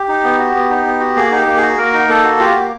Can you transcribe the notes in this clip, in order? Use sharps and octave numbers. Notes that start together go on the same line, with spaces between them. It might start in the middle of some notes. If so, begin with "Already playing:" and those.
Already playing: G4
D#4
B3
F#4
B3
D#4
B3
F#4
A#3 G#4
D#4 G4
A#3
G#4
F#4
A#3 A#4
D#4
A#3 A4
F#4
F4 G4
A#3